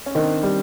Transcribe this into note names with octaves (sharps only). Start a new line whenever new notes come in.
C#4
D#3 C4 D4
G3